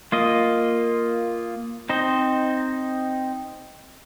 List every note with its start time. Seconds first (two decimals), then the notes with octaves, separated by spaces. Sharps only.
0.12 A#3 F4 D#5
1.89 C4 D#4 C5 D#5